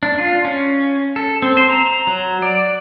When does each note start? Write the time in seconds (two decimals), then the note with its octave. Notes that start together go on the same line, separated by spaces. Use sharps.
0.03 D4
0.19 F4
0.45 C#4
1.16 A4
1.42 C4
1.57 C5
1.70 A#5
2.07 F#3
2.42 D5